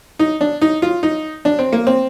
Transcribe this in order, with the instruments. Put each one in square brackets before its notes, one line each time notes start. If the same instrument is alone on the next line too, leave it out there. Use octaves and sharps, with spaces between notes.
[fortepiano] D#4
D4
D#4
F4
D#4
D4
C4
A#3
C4